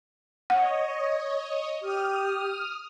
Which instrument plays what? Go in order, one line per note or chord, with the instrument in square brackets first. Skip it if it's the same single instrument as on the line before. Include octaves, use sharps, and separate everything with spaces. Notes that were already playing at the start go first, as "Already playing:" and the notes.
[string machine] C#5 D#5 [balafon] F#5
[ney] G4 [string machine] D#6 F6